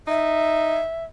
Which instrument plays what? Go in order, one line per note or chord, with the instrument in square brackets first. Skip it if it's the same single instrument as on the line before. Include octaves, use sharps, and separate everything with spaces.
[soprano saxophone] D#4 [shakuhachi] E5